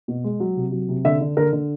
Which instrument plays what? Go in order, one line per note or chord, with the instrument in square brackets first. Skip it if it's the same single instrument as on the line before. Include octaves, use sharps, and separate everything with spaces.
[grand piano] B2
G#3
F#3
C3
F#3
C3
D3 E5
D3
D3 A#4
D3